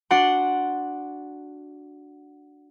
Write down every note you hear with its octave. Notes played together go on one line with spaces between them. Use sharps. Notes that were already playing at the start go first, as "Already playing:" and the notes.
D4 F#4 F#5 C6